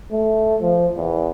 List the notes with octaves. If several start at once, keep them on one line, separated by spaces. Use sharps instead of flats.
A3
F3
E2